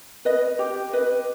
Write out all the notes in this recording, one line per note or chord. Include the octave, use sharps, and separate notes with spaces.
B4 D#5
G4
B4 D#5